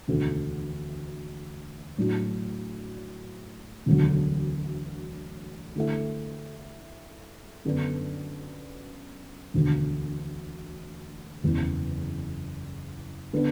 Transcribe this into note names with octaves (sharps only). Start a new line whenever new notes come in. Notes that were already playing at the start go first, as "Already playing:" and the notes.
E1 D2 D3
A2 F#3 D4 F#4
E1 D2 D3 F#3
D3 A3 E4 A4 E5
F#2 D3 B3 D4
E1 D2 D3
F#1 E2 E3
D3 B3 D4